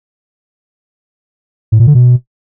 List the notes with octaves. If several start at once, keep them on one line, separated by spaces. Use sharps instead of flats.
A2
A#2
D3
B2